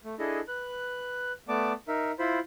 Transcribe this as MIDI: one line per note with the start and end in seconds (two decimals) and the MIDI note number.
0.05 0.15 57
0.19 0.40 62
0.19 0.40 64
0.19 0.40 68
0.19 0.40 69
0.19 0.40 75
0.48 1.32 71
0.48 1.32 90
1.48 1.73 57
1.48 1.73 59
1.48 1.73 74
1.48 1.73 81
1.48 1.73 86
1.88 2.12 63
1.88 2.12 70
1.88 2.12 76
2.19 2.40 64
2.19 2.40 65
2.19 2.40 72
2.19 2.40 83